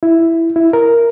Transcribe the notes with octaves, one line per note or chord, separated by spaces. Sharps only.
E4
E4
A#4